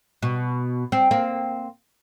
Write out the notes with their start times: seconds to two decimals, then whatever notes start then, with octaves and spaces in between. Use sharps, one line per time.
0.22 B2
0.92 C4
1.11 A#3 C4